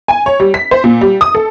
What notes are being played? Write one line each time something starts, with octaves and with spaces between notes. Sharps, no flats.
G#5
C#5
G3
B6
C5
A#2
G3
D#6
A4